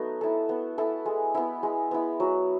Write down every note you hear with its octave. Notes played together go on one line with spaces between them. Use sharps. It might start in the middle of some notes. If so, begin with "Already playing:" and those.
Already playing: F#3 A3 B3 D#4
E4 A4
B3
E4 A4
G#3
B3 E4
G#3
B3 E4
F#3